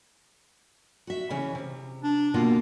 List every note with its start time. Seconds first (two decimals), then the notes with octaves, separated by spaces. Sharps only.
1.07 F#4 E5
1.30 C#3 E3 C#4
1.55 C3
2.03 D4
2.34 B2 D3 A#3 F4